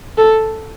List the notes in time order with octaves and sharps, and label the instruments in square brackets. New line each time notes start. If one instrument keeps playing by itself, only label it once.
[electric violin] A4